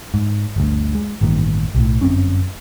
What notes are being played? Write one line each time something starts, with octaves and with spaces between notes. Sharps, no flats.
G#2
G1 D2
G#3
A1 G2 D#3 A#3
B1 A2
G1 F#2 C4 C#4